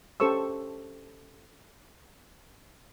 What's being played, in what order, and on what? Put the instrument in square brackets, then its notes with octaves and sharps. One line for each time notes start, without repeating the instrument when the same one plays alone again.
[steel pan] C#4 G4 A4 C5 C#6 E6